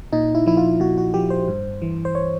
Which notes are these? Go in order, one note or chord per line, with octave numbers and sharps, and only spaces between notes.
A#2 D#4
E4
F3 E4
F4
A#2 F#4
F#4
F3 G4
C5
G2
E3
C5
C#5